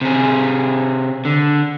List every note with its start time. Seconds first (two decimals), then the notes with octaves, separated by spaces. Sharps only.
0.01 C3 G#4
1.25 D3